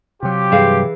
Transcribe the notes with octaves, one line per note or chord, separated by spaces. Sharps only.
C3 F#3 F4 G4
G2 E3 G#4 F5